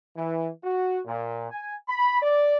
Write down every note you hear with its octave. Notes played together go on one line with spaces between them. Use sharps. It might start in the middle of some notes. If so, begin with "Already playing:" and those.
E3
F#4
A#2
G#5
B5
D5